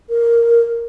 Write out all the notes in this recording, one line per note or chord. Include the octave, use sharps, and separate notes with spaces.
A#4